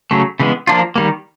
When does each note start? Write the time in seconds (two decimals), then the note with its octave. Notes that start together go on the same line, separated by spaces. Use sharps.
0.11 C#3 F#3 A3
0.40 C#3 E3 G#3 B3
0.67 F3 A#3 D4 F4
0.96 D#3 G3 A#3